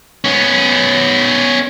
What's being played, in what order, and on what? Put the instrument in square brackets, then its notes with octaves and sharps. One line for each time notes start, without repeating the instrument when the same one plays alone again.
[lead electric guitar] B3 C#4